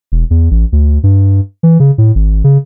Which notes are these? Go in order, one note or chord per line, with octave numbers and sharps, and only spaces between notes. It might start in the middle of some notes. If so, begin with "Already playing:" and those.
E1
E2
A1
D2
G2
E3
C#3
A2
G#1
C#3